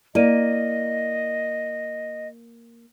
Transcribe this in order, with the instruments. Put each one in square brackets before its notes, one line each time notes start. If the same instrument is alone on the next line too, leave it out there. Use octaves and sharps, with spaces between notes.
[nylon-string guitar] A#3 [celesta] E4 D5 D#7 [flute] D#5